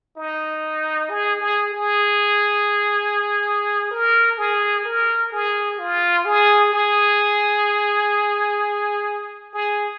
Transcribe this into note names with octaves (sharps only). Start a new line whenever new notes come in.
D#4
G#4
G#4
G#4
A#4
G#4
A#4
G#4
F4
G#4
G#4
G#4